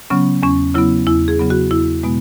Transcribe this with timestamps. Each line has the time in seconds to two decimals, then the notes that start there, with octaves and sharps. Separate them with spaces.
0.10 C#3 F#3 B3 C#4
0.43 E2 C#4
0.74 C#3 F#3 B3 E4
1.07 E2 E4
1.28 G#4
1.39 C#3 F#3 B3
1.50 F#4
1.71 E2 E4
2.03 B2 G#3 B3